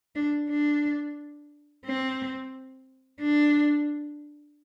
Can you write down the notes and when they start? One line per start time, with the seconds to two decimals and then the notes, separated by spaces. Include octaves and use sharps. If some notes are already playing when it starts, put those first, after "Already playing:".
0.15 D4
0.49 D4
1.85 C4
3.20 D4